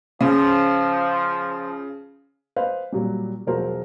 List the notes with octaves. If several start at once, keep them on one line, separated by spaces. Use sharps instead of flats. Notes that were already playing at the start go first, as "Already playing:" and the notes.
C#3 F3
B4 C5 D#5 F5
A#2 F#3 G3
E1 F3 F#3 A#4 C5